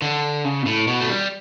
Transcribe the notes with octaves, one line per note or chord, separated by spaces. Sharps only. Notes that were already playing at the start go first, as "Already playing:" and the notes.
D3
C#3
B2
A2
B2
A3
G3